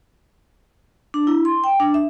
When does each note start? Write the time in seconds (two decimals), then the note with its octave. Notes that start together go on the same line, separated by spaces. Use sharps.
1.14 D4
1.27 E4
1.45 C6
1.64 G5
1.80 D4
1.94 E5